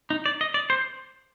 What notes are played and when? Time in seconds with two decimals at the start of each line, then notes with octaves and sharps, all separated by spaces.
0.10 D#4
0.26 D5
0.41 D#5
0.54 D5
0.70 C5